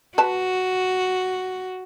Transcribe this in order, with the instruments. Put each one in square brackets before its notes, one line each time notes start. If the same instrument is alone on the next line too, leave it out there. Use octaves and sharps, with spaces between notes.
[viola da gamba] F#4 [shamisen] B4 A5